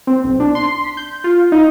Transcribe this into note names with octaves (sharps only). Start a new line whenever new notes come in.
C4
B1
D4
C6
B6
G6
F4
D#4